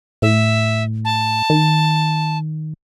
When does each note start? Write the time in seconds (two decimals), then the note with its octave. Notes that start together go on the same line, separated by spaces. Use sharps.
0.22 A2 E5
1.05 A5
1.50 D#3